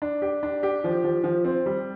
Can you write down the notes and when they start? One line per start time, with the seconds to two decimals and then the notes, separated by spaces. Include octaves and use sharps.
0.02 D4
0.22 G4
0.43 D4
0.63 G4
0.84 F3
1.04 F3
1.24 F3
1.45 C4
1.66 G3